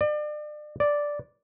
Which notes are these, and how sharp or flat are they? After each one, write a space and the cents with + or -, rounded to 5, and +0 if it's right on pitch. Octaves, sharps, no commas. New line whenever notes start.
D5 +35
D5 -5